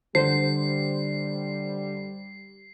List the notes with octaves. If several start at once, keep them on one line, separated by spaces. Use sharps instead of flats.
D3 G3 C5 C7